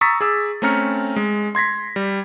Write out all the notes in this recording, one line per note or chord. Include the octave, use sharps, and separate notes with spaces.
A#5 C#6 D#6 E6 A6 B6
G#4 D6 E6
A3 C4 C#4 A#5 F6 C#7
G#3
C6 G#6 A#6 B6
G3